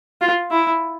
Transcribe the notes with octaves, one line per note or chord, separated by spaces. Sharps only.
F4
E4